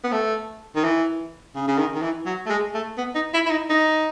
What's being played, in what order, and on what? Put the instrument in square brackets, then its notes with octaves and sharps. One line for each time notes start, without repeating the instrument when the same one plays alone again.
[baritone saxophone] B3
A3
D#3
E3
C#3
C#3
D#3
D#3
E3
F#3
A3
G#3
A3
B3
D#4
E4
E4
D#4
D#4